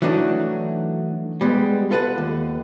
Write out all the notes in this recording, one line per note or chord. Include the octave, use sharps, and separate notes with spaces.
E3 F#3 A3 D4 D#4 F#4
G3 G#3 B3
F4 A4 B4 D#5 F#5
D#2